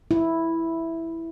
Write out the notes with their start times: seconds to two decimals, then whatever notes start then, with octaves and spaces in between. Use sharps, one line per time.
0.11 E4